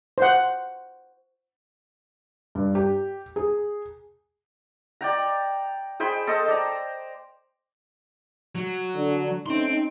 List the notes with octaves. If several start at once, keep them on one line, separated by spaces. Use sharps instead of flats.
C5 F#5
G2
G4
G#4
D5 G5 A#5
G#4 C5 G5 B5
A4 C5 D#5
D5 A#5
F#3
D3
A3 C4 C#4 D#4 C6